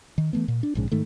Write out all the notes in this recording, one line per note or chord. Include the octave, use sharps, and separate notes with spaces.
D#3
E3 A3 B3
A#2
D4
A#1 G#2 C#3
G#2 D#3 A3